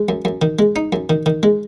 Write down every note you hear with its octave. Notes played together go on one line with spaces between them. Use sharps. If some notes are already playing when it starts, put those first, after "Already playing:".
Already playing: G#3
F#2
F#2
D#3
G#3
D#4
F#2
D#3
D#3
G#3